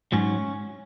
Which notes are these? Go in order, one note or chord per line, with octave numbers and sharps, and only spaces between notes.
G#2 F#3 C#4